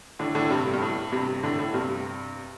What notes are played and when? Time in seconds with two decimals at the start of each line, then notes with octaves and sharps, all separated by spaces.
0.19 A2 D3
0.35 A2 D3
0.51 G2 C3
0.74 G2
0.82 A2
1.12 G2 C3
1.43 A2 D3
1.59 A2
1.74 G2 C3